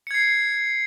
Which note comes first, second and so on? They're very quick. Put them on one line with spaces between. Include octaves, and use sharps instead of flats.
C#7 G#6 C7